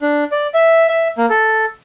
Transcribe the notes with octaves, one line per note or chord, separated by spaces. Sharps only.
D4
D5
E5
E5
A#3
A4